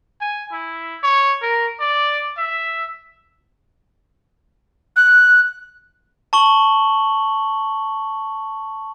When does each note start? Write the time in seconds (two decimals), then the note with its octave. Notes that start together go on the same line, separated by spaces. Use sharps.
0.21 G#5
0.52 E4
1.03 C#5
1.42 A#4
1.80 D5
2.38 E5
4.96 F#6
6.33 A5 C#6 F#7 G7